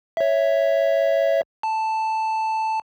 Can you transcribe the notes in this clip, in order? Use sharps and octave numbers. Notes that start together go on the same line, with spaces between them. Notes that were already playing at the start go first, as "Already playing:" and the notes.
C#5 E5
A5